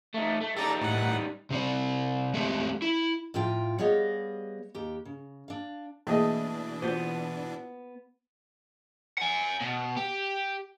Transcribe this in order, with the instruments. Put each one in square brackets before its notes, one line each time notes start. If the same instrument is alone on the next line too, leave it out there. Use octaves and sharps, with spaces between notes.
[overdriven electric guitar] A3 D#4
A3
[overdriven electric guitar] G3 D#4 [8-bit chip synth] A4 D5 A#5
[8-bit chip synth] A2 F#5
[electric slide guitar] C3 C4 D5
G#3 A3 C4 G4
E4
[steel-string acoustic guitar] A2 F3 F4 G5
G3 B3 G#4 C#5 D#5 F5
D#2 G4
C#3
D4 F5
[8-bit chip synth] B2 E3 D4 [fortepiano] A3 G#4 D#5 [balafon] A#3
[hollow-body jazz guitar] B3 C5 [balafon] F4 F#4 B4
[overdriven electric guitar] F#5 G#5
B2
G4